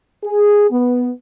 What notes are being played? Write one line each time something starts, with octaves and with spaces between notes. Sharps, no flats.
G#4
B3